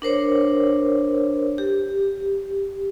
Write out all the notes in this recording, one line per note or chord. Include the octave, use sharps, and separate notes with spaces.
D4 A#4 C5 C#5
G4